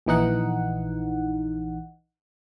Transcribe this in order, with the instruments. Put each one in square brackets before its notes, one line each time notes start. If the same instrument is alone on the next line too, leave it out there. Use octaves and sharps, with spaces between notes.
[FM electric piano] A#1 E3 D#4 F#5